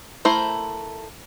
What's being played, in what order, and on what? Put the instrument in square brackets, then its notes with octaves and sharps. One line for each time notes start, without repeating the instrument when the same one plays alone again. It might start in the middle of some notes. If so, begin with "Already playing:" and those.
[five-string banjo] A3 E4 A#4 C5